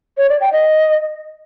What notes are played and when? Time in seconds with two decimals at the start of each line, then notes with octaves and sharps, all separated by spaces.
0.18 C#5
0.29 D5
0.41 G5
0.53 D#5